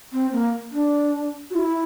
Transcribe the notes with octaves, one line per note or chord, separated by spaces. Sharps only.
C4
A#3
D4
F#4
E4